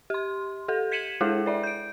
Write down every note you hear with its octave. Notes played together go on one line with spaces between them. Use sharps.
G4 C6
G4 A4
G#6 B6 C#7 D#7 E7 F#7
G#3 D4 E4 G#4 A4
B4 D5 E5
G6 D7